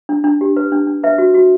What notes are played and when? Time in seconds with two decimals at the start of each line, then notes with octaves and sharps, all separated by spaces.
0.09 D4
0.24 D4
0.41 G4
0.57 B4
0.72 D4
0.87 D4
1.03 B4 E5
1.18 F#4
1.34 F#4